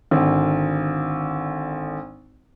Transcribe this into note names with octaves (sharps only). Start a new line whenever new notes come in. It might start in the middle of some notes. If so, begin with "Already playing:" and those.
G#1 D3